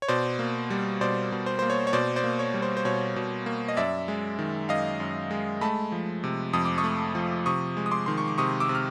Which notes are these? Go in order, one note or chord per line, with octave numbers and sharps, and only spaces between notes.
C#5
B2 C5 D5
A#3
G3
B2 C5 D5
B2
C5
A#3 C5
C#5
C#5
B2 C5 D5
C5 D5
A#3
C#5
G3
C5
C5
B2 C#5
B2
A#3
D#5
F#2 D5 E5
G#3
D#3
F#2 D#5 F5
F#2
G#3
A3 A5 B5
F3
C3
F2 D#6
D6
C#6 D#6
A3
F3
C3 C#6 D#6
G#3
D#6
C6 D6
D#3 C6
C#6
D6
C3 C#6 D#6
D6 E6
C3
F6